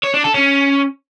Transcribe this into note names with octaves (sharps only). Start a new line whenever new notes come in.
C#5
D4
A4
C#4